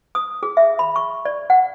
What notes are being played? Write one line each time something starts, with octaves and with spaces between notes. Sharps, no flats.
D#6
G#4
E5
B5
C#6
D5
F#5